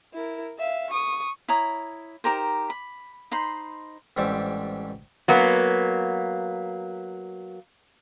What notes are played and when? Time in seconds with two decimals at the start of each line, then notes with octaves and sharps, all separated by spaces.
0.14 E4 A#4
0.59 E5 F5
0.90 C#6 D#6
1.48 E4 C#5 A#5 D#6
2.24 D#4 G4 A#4 C5
2.70 B5
3.31 D#4 C5 B5 C6
4.17 A1 G#2 G3 C4 D5 E5
5.28 F#3 A#3 B3